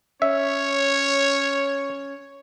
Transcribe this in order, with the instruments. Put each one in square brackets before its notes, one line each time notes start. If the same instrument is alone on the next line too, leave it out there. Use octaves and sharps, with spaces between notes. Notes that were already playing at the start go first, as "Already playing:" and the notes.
[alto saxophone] C#4 [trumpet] C#5 [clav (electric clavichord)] E5